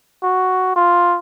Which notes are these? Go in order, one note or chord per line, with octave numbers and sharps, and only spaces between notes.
F#4
F4